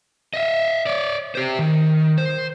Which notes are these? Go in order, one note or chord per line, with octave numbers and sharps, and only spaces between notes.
D#5 E5
C#5 D5
G4 C5
D#3
C5